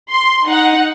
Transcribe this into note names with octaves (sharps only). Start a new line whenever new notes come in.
C6
D#4 F#5